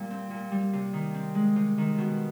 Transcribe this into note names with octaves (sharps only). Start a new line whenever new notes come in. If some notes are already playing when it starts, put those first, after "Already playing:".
Already playing: A#2 G3
C4
A#2
G3
C3
D#3
C4
G#3
C3
D#3
B2